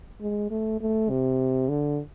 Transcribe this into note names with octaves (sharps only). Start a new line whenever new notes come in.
G#3
A3
A3
C3
D3